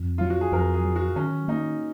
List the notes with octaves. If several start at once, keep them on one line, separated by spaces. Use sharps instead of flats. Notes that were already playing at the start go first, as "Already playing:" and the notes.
Already playing: F2
F#3 F4
F#4
G#4
F2 A#4
G#4
F#3
F#4
D#3 C#4
A#3 D#4